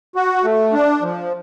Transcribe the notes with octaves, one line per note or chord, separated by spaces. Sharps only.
F#4
A3
D4
F3